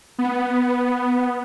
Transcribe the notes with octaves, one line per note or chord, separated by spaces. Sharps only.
B3